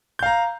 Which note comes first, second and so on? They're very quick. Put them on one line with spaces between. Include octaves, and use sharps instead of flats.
G6 F5 A#5